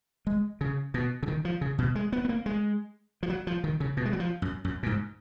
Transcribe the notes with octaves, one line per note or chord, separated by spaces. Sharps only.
G#3
C#3
B2
C#3
D#3
F3
C#3
B2
G#3
B3
B3
A#3
G#3
F3
F#3
F3
D#3
C#3
B2
G#3
F#3
F3
F#2
F#2
A#2
G#2